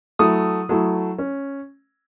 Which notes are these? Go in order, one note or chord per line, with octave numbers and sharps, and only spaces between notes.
F#3 A3 E4 D#6
F#3 A3 E4
C#4